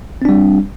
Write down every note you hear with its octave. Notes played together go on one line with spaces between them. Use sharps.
G3 C4 D4